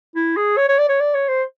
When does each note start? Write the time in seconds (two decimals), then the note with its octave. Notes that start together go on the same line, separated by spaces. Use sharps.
0.15 E4
0.36 G#4
0.57 C#5
0.68 C#5
0.78 D5
0.89 C#5
1.00 D5
1.14 C#5
1.28 C5